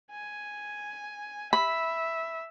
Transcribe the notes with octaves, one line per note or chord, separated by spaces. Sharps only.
G#5
E5 B5